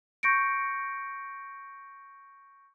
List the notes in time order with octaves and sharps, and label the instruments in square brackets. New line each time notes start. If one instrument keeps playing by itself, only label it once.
[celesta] C#6 G6 A#6 C#7 D7